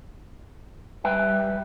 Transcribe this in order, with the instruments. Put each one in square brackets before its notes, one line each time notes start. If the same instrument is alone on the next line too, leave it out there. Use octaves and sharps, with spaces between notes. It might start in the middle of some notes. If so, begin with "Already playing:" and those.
[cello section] G3 [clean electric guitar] B4 E5 G5